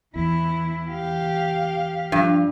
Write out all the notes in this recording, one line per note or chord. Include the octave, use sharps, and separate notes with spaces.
E2 E3 E4
G4 F5
G2 F3